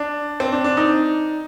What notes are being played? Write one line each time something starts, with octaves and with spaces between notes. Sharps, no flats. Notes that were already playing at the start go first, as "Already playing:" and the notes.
Already playing: D4
C4
D4
D4
D#4